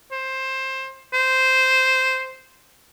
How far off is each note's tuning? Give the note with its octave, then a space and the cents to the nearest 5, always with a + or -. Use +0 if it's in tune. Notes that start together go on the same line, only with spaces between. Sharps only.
C5 +15
C5 -5